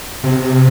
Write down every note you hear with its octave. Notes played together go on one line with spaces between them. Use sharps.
C3